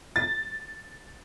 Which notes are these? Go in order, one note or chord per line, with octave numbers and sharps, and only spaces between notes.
A6